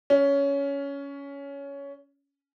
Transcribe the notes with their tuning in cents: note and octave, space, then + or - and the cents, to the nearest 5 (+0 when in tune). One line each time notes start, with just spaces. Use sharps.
C#4 +15